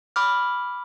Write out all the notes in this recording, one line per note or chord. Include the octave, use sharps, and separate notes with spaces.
B5 D6 F6